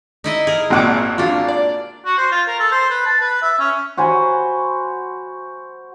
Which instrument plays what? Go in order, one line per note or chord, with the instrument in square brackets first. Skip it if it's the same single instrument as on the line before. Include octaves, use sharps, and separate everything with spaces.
[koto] D#4 E4 D#5
G#4 A#4
[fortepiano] G#1 A#2 F#5 [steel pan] D#4 G5 D6
[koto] A#3 D4 [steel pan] F4 F#4 F5
[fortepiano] D5
[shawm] F#4
C5
F4
A#4
A4
C5
B4
A5
B4
E5
C#4
[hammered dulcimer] F#4 C5 G#5 B5